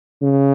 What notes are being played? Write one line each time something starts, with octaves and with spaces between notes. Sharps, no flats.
C#3